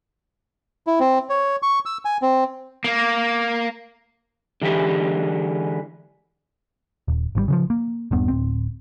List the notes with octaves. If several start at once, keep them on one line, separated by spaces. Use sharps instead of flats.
E4
C4
C#5
C#6
E6
G#5
C4
A#3
D3 E3 G#3 G4 B4
D#1
G#1 C#3 G3
C#3 E3 F3
A#3
D#1 G2 B3
D1 G#1 C4